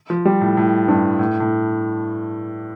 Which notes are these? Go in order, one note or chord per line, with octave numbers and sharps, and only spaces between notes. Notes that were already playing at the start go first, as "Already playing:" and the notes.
F3
G3
A2
A2
G2
A2
A2